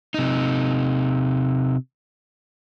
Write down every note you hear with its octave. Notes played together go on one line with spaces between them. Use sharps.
C3 D#4